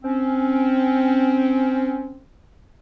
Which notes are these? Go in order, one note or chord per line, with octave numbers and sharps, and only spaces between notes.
C4 C#4